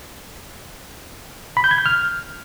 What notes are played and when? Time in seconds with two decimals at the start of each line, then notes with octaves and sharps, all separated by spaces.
1.57 B5
1.64 G6
1.71 G#6
1.78 G6
1.86 F6